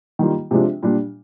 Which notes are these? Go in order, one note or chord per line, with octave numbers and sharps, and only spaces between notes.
D#3 G3 A#3 F4
C3 F3 G#3 D4 F4
A#2 G3 D4